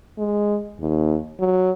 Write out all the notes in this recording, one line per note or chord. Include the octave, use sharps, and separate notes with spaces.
G#3
D#2
F#3